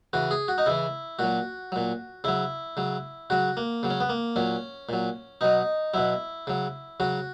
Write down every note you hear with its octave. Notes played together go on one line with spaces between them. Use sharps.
C#3 E3 F#4
G#4
F#4
D#4
C#3 E3 E4
A#2 F#3 F#4
A#2 F#3
C#3 F#3 E4
C#3 F#3
C#3 F#3 F#4
A#3
C#3 F#3
C#4
B3
A#3
A#2 F#3 C#4
A#2 F#3
B2 F#3 D#4
B2 F#3 E4
C#3 F#3
C#3 F#3 F#4